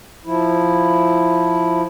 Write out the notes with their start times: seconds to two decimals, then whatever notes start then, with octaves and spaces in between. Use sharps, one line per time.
0.25 F3 E4